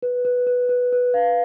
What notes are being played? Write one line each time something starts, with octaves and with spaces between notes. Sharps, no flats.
B4
B4
B4
B4
B4
F5